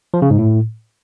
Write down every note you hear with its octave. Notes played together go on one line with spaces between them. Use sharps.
F3
C#3
G#2
A2